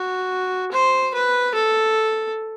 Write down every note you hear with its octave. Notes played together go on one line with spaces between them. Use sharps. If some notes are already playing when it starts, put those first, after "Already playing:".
Already playing: F#4
C5
B4
A4